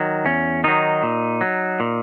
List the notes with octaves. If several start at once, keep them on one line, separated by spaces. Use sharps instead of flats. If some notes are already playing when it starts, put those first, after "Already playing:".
Already playing: D#3 F#3
E2 C#4
D#3 F#3 D#4
A#2
F#3
A#2